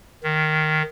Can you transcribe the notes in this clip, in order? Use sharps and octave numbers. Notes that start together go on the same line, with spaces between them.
D#3